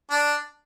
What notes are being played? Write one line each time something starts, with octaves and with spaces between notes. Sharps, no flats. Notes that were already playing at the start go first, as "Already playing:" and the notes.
D4